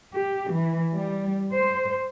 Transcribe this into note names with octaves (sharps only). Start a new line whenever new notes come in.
G4
E3
G3
C5